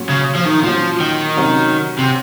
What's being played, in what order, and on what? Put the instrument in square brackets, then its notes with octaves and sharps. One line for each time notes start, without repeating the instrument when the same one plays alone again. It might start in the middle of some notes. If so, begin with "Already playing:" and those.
Already playing: [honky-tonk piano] A#2 F#3 C#4
[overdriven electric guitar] C#3
F3
D#3
[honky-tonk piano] A#2 F#3 C#4 [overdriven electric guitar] F3
[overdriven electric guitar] D#3
[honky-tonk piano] C3 F#3 C#4 F#4
[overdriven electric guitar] C3